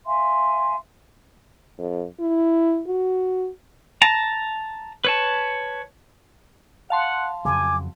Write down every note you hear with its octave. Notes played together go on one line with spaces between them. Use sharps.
E5 F5 G#5 C6
F2
E4
F#4
A5 A#5
B4 C#5 A5
F5 F#5 A5 C6
F2 C#3 F#3 G#5 D6